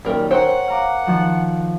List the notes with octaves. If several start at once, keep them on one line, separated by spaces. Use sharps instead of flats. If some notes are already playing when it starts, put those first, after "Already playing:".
F#2 A#2 D#3 G3 A#4 G5
A#4 C5 C#5 F#5 G5
F5 A#5 D6
D#3 F3